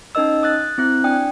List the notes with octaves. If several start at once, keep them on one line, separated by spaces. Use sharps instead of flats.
C#4 D#4 A#4 D#5 E6
D#6 F#6 A6
C4 E4 F#6
D4 D5 G5 D#6